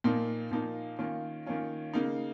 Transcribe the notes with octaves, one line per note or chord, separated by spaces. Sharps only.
A#2 F3 A#3 D#4
A#2 F3 A#3 D#4
D#3 A#3 C#4 F4
D#3 A#3 C#4 F4
C#3 A#3 D#4